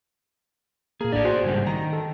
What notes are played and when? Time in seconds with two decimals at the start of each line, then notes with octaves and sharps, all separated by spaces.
1.01 A#2 A#3 G#4
1.13 A#1 A2 D4 G#4 D5
1.25 F#4 C5 G#5
1.44 G#2 C#3 G3
1.66 D#3 A#5
1.93 A4